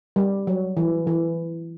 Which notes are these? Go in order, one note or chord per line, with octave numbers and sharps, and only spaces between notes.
G3
F#3
E3
E3